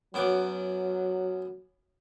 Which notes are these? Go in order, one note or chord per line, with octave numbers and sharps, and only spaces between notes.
F#2 F#3 B3 D6